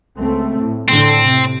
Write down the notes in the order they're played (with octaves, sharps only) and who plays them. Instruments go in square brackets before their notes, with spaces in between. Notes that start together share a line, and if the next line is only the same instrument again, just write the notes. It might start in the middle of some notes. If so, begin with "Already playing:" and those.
[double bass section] C#2 A3 C4
A2
[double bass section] A2 D3 [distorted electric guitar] C4
[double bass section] C3